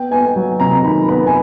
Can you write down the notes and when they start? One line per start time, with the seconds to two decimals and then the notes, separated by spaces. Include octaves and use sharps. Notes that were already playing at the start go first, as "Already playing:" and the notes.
Already playing: B3 G5
0.11 B3 G#5
0.36 F#3
0.60 C3 A#5
0.83 D#3 B5
1.08 B3 B5
1.27 G#5